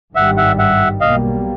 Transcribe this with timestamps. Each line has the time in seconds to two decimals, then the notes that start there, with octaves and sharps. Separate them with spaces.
0.15 G#1 G2 D#3 G3 E5 F#5
0.37 E5 F#5
0.59 E5 F#5
1.01 B1 B2 G3 A#3 D#5 F5